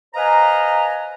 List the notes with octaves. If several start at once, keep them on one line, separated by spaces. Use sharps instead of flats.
B4 C5 D#5 F5 G#5 A#5